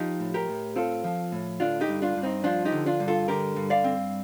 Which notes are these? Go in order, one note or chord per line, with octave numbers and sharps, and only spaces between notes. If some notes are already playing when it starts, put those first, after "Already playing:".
Already playing: F3 D#4 G4
A2
G4 A#4
A2
C4 F4 A4
F3
A2
D3 D4 F4
D#4 G4
G2
D4 F4
G2
C4 D#4
F3 D4 F4
D#4 G4
D3
D4 F4
G2
F4 A4
D3 G4 A#4
G2
D5 F5
C4